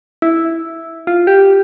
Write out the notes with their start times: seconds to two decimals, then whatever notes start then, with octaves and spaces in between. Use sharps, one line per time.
0.22 E4
1.07 F4
1.27 G4